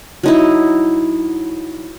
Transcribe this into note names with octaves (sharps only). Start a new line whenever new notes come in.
F#3 D#4 E4